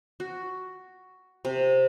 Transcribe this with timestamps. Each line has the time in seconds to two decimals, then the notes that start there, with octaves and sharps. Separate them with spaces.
0.20 F#4
1.45 C3